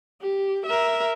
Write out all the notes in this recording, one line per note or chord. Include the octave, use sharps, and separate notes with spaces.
G4
A#4 E5